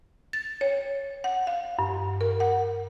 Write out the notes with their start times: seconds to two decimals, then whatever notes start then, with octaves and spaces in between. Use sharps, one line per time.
0.33 A6
0.61 C#5
1.24 F#5
1.47 F5
1.79 G2
2.21 A#4
2.40 F#5